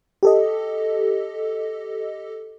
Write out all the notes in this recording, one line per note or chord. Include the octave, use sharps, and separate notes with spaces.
G4 A4 D#5